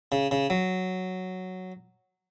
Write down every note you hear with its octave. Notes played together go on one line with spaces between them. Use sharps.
C#3
C#3
F#3